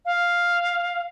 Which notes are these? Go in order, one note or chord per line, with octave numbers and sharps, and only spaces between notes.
F5